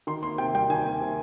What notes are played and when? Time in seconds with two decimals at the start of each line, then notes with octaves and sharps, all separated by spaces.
0.07 D#3 C6
0.23 A#3 C6
0.38 C3 G5
0.54 G3 G5
0.70 D#3 G#5
0.86 A#3
1.01 C3